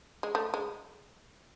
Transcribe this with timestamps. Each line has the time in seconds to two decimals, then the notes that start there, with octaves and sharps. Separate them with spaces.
0.23 G#3
0.35 A3
0.54 G#3